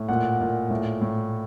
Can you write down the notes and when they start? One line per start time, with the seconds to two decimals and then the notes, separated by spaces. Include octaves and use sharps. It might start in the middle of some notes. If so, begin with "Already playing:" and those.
Already playing: A2
0.09 A#2 F#5
0.40 A#2
0.70 A2
1.01 A2